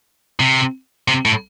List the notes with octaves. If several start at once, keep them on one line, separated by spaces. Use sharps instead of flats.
C3
C3
A2